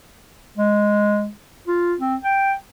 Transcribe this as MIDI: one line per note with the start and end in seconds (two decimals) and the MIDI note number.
0.57 1.28 56
1.67 1.95 65
2.00 2.16 60
2.24 2.53 79